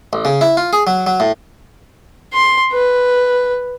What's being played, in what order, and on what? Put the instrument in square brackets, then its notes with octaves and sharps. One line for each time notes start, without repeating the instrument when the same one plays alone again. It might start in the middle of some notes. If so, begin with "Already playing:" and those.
[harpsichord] A1
C#3
E4
F4
G#4
F#3
F#3
A2
[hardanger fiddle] C6
B4